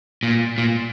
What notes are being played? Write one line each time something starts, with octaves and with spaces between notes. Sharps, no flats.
A#2
A#2